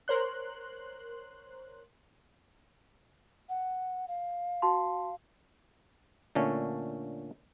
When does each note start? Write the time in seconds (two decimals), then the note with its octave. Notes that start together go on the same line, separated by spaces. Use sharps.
0.08 A#4 C5 C#5 C6 F#6
3.49 F#5
4.08 F5
4.62 F#4 A5 C6
6.35 A#2 D3 A3 C#4